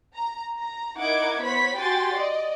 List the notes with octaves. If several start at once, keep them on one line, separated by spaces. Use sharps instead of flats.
A#5
A#5
D#4 E4 A#4 F#5 D6 G#6
B3 C5 C#5 B5 B6
F#4 G4 G5 G#5 C6 A6
D5 D#5